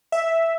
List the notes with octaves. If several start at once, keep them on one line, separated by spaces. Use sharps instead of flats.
E5